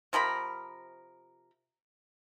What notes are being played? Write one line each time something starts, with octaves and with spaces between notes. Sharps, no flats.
C3 F3 A#4 B5